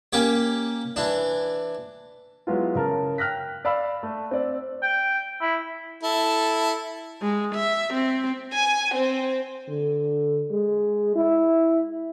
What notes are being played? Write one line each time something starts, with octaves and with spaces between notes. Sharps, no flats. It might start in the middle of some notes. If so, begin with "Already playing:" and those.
A#3 C#4 G4 C#5
E3 D4
F#3 G#3 B3 E4 F4
C#3 A#4 A5
G5 F6 F#6 A#6 B6
D5 F5 B5 E6
A3
C4 D5
G5
E4
E4 A4
G#3
E5
C4
G#5
C4
D3
G#3
E4